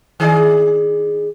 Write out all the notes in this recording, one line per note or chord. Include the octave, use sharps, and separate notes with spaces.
D#3 G#4 D5